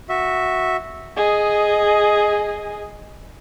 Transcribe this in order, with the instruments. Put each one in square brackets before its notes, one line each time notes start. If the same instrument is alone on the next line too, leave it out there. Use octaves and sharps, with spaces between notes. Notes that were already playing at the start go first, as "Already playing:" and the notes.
[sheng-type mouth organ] F#4 E5
[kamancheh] G#4 D#5